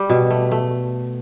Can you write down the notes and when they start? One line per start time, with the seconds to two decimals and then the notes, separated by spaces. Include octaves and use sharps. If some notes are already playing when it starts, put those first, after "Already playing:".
Already playing: G3 G4
0.10 B2
0.30 A3
0.52 A3